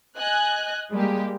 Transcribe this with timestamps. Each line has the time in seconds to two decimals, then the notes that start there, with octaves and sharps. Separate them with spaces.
0.18 D#5 G#5 F#6
0.93 G3 G#3 A#3 G4